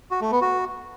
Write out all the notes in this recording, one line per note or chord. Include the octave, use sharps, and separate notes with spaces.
F#4
A3
B3
F#4